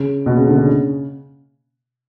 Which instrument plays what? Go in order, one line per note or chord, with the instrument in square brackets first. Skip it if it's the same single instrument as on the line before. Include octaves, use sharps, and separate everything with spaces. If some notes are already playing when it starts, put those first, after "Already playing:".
Already playing: [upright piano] C#3
B2
C#3
D3
C#3